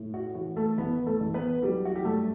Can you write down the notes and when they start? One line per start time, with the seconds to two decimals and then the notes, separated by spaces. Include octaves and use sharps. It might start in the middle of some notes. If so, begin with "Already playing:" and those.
Already playing: A2
0.14 F#4
0.35 E3 F#4
0.56 A3 A4
0.78 A1 B3 B4
1.07 A3 A4
1.20 A1
1.34 B3 B4
1.62 F#3 G3 G4
1.85 F#4
1.96 G4
2.05 G2 A3 A4